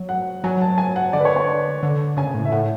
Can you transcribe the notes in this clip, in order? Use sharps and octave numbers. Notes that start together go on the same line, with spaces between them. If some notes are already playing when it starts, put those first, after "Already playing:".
Already playing: F#3
F#5
F#3 G#5
A5
G#5
F#5
D3 D5
B4
C#5
C#5
D5
D3
C#3 G#5
A2
E5
A2 F#5